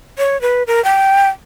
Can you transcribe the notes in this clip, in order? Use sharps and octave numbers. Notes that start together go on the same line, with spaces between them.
C#5
B4
A#4
G5